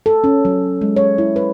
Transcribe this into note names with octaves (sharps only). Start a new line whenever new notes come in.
A4
C#4
F#3
G#3
C#5
E4
B4